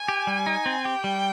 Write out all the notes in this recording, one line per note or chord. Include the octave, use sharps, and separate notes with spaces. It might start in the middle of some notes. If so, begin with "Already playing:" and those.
Already playing: G#5
G4
G3
D#4
C4
G4 G5
G3